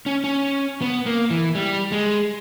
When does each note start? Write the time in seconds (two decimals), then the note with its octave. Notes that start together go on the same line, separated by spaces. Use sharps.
0.06 C#4
0.24 C#4
0.82 B3
1.06 A#3
1.30 E3
1.55 G3
1.92 G#3